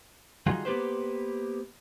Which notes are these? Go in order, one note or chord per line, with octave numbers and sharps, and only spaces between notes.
D#3 G3 F4 F#4 G#4
A#3 B3 G4 B4 C5